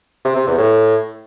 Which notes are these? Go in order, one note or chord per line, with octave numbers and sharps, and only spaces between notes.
C3
C3
E2
A2